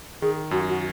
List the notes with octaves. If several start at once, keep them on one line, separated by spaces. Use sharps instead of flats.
D#3 G#4
F#2 F#4
F#4